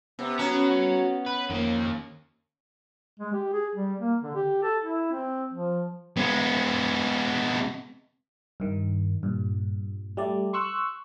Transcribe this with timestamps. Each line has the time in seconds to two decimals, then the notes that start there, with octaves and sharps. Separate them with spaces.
0.19 C3 B3
0.39 C#4 F#4 A#5
1.26 B4
1.50 F2 D#3 A#3
3.20 G#3
3.33 G4
3.53 G#4
3.76 G3
4.00 A#3
4.23 D3
4.35 G4
4.63 A4
4.82 E4
5.12 C4
5.53 F3
6.17 G#3 B3
8.60 G2 D#3
9.23 G2 A#2
10.17 G3 A3 D5
10.53 C6 C#6 E6 F#6